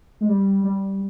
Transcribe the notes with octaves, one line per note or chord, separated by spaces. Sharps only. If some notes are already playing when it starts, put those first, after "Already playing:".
G#3
G3
G3